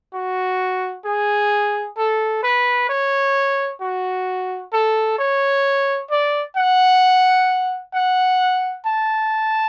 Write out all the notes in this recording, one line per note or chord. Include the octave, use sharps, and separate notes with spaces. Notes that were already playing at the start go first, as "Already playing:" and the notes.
F#4
G#4
A4
B4
C#5
F#4
A4
C#5
D5
F#5
F#5
A5